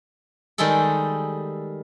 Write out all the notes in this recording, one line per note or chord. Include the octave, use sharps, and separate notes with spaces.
D#3 G3 G#3 G#4 A4